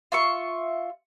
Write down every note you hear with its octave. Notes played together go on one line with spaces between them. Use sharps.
F4 E5 C#6